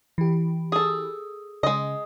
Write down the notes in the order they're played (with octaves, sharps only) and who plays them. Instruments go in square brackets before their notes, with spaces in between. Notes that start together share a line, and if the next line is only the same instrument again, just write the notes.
[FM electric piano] E3 G4
[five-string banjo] G#4 A4
[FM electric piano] C#3 [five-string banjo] G#3 D#5